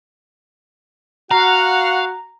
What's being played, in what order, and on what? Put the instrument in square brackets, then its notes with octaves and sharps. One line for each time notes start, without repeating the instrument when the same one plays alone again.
[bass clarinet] F#4 [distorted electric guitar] F5 [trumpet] F#5 [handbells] A#5